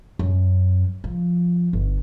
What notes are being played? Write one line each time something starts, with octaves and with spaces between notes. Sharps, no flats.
F#2
F3
G1